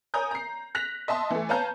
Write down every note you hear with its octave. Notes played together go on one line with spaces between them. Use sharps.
A#4 C#5 G#5 A#5 D#6 G6
A#5 C7
F#6 A#6 B6 F7
D#5 E5 A5 C6
E3 A3
B4 C#5 F5 A5 A#5 G6